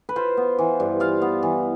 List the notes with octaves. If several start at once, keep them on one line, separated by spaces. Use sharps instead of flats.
B4
F4 C5
B3
E3
G2
F4 F5
B3
E3